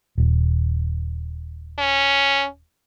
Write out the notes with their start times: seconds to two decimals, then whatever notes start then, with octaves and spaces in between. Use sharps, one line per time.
0.18 D#1
1.79 C#4